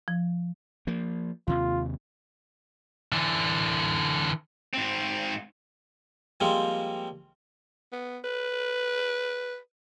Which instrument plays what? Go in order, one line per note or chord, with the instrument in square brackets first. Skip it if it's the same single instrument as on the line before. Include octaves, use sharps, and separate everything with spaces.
[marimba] F3
[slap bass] F3 A#3
[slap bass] D#2 C3 [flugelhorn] F4
[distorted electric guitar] D3 E3
G#2 C4
[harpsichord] F3 G3 G#3 A#3 C4 F4
[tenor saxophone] B3
B4